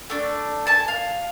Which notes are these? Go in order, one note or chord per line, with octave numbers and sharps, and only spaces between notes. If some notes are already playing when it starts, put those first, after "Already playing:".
A3 D4
G#5 A5
F5